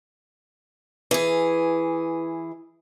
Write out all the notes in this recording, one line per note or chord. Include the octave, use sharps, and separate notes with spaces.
E3 G#4